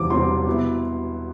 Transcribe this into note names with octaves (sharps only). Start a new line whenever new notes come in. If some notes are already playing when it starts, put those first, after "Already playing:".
Already playing: E1 E2 C3 G3 C4 D6
E1 E2 C3 G3 C4 C6
B2 B3 E4